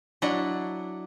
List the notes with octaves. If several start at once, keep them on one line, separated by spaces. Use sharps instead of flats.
F#3 D4 E4 D#5 F#5